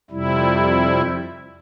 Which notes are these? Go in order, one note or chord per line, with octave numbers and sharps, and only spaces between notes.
F2 C3 G3 E4